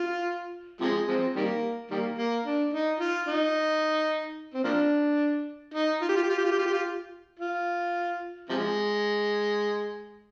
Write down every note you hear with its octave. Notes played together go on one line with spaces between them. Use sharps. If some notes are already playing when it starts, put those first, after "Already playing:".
Already playing: F4
C3 F3 G#3
F3 G#3 C4
D#3 G3 A#3
D#3 G3 A#3
A#3
D4
D#4
F4
D#4
C4
F3 A#3 D4
D#4
F4
G4
F4
G4
F4
G4
F4
G4
F4
G4
F4
F4
C3 F3 G#3